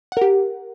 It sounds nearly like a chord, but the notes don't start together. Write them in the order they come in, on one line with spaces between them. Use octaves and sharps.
F#5 A#4 G4